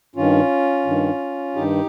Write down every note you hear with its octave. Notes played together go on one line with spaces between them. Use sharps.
G2 D#3 C#4 F4
G2 D#3
G2 D#3 D#4 G4